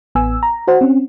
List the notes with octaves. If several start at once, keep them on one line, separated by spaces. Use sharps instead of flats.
A1 B3 G#5 E6
A#5
F#4 C5 F#5
C4 C#4